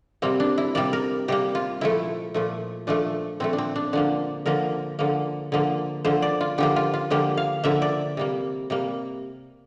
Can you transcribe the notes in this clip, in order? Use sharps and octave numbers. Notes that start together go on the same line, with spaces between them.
C3 G3 A#3 C4
D4
E4
C3 G3 A#3 D5
A#4
C3 G3 A#3 G4
F4
A#2 F3 A3 E4
A#2 F3 A3
A#2 F3 A3 D4
A#2 F3 A3 C4
D4
C4
D4
D3 F3 A#3 D4
D3 F3 A#3 A#4
D3 F3 A#3
D3 F3 A#3
D3 F3 A#3 C5
D5
F4
D3 F3 A#3 G4
F4
F4
D3 F3 A#3 G4
F5
D3 F3 A#3 E5
D5
C3 G3 A#3
C3 G3 A#3